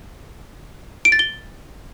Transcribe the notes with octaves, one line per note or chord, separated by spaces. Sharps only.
D7
A6
G7